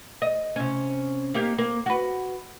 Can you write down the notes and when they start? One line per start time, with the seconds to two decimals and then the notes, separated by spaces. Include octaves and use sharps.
0.22 D#5
0.56 C3 C#4
1.34 A#3 D#4 G4
1.58 A#3 A#4
1.86 F#4 B4